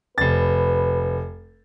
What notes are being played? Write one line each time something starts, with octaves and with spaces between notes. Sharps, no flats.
F1 B4 A6